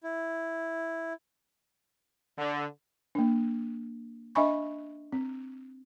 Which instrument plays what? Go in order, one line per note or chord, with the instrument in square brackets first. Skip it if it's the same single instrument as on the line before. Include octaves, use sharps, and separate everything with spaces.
[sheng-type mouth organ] E4
[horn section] D3
[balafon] A#3 D4
D4 D#5 E5 G#5 B5 C#6
C4